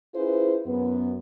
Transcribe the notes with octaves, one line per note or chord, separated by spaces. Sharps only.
C#4 E4 F4 G#4 B4 C5
F#2 B3